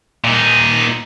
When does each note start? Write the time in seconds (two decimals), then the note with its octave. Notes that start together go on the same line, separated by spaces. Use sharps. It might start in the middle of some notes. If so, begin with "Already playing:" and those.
0.24 A#2 D#4